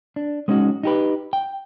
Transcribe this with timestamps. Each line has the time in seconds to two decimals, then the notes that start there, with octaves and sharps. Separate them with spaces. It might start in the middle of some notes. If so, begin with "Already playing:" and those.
0.16 D4
0.48 G#3 B3 C#4 D#4 F#4
0.83 D#4 G4 B4
1.33 G5